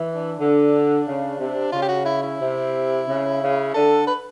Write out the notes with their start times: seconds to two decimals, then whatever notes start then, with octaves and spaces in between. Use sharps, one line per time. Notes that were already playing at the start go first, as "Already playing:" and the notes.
Already playing: E3
0.15 D4
0.37 D3
1.06 C#3
1.38 C3
1.72 C#3 F4
1.82 G4
1.89 F#4
2.06 E4
2.23 E4
2.40 C3
3.07 C#3
3.41 C#3
3.74 D3 A4
4.07 B4